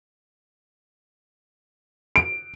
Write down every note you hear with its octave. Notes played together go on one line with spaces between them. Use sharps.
D7